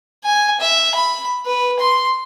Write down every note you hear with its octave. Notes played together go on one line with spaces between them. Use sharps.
G#5
E5
B5
B4
C6